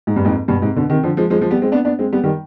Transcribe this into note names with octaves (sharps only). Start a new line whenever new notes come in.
G#2
G2
F2 G#2
G2 B2
G#2 C3
B2 D3
C3 D#3
D3 F3
F3 G#3
F3 G#3
F3 G#3
G3 B3
G#3 C4
B3 D4
B3 D4
G#3 C4
G3 B3
D#3 G3